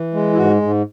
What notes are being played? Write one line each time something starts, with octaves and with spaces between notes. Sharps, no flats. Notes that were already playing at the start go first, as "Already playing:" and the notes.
Already playing: E3
G#3
E4
G#2 F#4
G#2